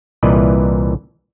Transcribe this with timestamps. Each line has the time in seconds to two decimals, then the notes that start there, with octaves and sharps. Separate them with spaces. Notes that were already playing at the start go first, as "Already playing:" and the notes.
0.23 C2 A#2 E3 B4 D5 D#5